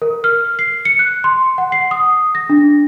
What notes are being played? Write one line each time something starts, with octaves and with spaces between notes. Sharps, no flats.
A#4
F6
C7
C#7
F#6
C6
F#5
C7
D#6
A#6
D4